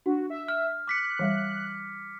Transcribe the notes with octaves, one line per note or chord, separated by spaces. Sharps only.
D4 F#4
E5
F6
D6 F#6 B6 C#7
E3 G3 E5